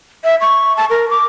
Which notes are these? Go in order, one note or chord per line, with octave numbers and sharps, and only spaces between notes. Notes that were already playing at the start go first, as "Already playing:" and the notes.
E5
C#6
A5
A#4
D6